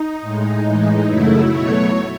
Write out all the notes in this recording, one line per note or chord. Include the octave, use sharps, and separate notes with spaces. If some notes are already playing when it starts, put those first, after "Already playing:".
Already playing: D#4
A2 G#3
A2 E3 G#3
F#2 C#3 F#3 A3 E4
B2 F#3 A3 C#5